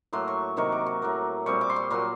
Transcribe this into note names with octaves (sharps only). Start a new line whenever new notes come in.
A2 F#3 A#3 C6
C#6
C3 D#3 F#3 A#3 C#6
D6
C#6
A2 F#3 A#3
A#2 G3 C4 F4 C#6
D6
C6
C#6
A#2 F#3 A#3 C6